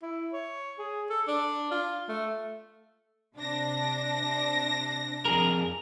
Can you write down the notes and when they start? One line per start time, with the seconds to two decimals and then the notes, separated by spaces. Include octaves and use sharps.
0.02 E4
0.33 C#5
0.79 G#4
1.10 A4
1.28 D4
1.71 F4
2.09 A3
3.36 C3 D4 A#6
5.25 F2 G#4 A#4